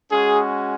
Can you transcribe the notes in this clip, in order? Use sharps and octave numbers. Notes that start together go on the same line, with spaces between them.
G#3 C#4 F#4 G#4